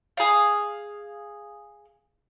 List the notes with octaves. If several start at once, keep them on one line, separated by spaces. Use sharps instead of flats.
G#4 F5